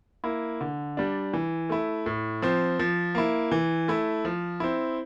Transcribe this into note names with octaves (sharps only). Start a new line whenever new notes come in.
A#3 E4
D3
G3 D4
E3
A3 E4
A2
F3 C4
F3
A#3 E4
E3
A3 E4
F3
C4 E4